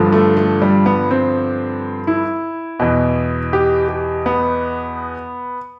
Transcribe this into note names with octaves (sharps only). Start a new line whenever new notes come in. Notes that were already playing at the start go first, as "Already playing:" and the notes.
Already playing: G2 D3 F3
A3
A3
G3
B3
C4
E4
E2 B2
G4
G4
B3